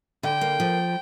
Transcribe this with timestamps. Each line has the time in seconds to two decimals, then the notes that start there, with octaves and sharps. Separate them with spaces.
0.23 D3 G5
0.41 A#3
0.60 F3